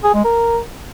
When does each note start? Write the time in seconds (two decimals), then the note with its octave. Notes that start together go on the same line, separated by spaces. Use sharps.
0.03 G#4
0.14 G#3
0.24 A#4